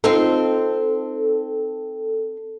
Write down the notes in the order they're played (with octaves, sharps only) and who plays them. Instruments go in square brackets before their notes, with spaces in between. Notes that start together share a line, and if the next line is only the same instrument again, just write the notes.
[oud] C4 D#4 F4 [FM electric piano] A4